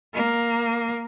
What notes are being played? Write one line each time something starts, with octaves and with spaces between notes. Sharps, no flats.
A#3